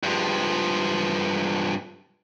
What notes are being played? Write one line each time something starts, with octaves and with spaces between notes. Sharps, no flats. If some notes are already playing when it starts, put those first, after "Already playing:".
G2 F3